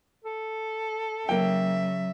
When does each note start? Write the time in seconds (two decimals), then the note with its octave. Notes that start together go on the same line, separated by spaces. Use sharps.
0.25 A4
1.29 C#3 F#3 A#3 E5 G5